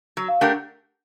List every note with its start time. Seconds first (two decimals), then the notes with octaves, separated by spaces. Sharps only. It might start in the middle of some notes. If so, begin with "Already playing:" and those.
0.17 F#3
0.28 F5
0.41 A3 D4 G4 A#4 F#5